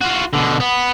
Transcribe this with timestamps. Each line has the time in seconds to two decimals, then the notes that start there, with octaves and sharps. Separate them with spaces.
0.01 F4 F#4
0.33 B2 D3
0.60 B3